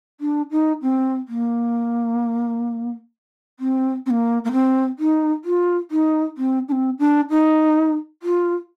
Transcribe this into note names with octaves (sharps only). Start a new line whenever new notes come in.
D4
D#4
C4
A#3
C4
C4
A#3
A#3
C4
D#4
F4
D#4
C4
D4
C4
D4
D#4
F4